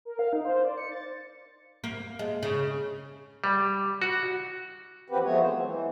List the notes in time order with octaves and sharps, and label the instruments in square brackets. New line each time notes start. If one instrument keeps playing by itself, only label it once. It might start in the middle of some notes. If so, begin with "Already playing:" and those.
[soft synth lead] A#4
F5
D#4
C5
D5
C#7
A6
[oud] A#3
G#3
C#3
[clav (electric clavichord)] G3
F#4
[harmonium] E2 F3 C4 F#4 G4 B4
F3 G#3 A3 B3 F#4 C#5
E3 C5
F#3 A#3 C4
E3